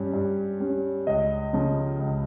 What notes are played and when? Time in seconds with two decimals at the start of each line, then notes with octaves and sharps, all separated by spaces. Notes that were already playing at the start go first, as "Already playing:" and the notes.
Already playing: G2 G3 C#4
0.13 G2
0.60 G3 C#4
1.07 C#2 D#5
1.53 C#3 F3
1.99 C#2